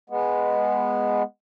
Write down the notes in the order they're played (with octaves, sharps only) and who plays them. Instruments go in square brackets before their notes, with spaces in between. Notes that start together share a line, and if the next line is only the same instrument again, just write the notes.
[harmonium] G#3 B3